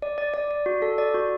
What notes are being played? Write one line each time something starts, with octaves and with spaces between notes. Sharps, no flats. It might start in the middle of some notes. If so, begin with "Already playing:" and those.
D5
D5
D5
D5
F#4
A4
D5
F#4